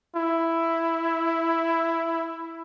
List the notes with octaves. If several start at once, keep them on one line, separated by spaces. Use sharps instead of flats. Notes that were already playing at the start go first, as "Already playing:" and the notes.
E4